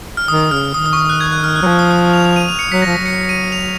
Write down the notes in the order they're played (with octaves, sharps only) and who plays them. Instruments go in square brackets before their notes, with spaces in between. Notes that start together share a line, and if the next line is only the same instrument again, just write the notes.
[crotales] F6
[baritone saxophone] D#3 [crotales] D#6
[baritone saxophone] C#3 [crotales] F6
[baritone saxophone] D#3 [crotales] D#6
[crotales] D#6
C#6
D#6
F#6
G#6
F#6
F6
F#6
[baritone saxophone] F#3
F3
[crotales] D#6
F#6
F7
F7
D#7
F7
C#7
[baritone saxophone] F#3 [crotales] B6
[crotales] A#6
[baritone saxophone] F3
[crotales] B6
[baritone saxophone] F#3
[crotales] C#7
D#7
F7